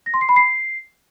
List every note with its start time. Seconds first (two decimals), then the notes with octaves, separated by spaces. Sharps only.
0.06 A#6
0.14 C6
0.21 C7
0.29 B5
0.36 C7